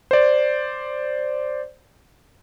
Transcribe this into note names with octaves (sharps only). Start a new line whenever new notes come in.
C5 D5